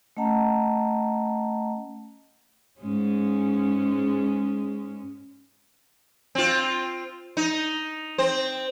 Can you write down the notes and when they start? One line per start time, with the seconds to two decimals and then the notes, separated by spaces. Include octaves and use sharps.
0.17 A3 C#4 D#5 F#5 A5 A#5
2.80 G#2 G#3 C#4
6.35 C4 F4
7.37 D#4
8.18 C4 C5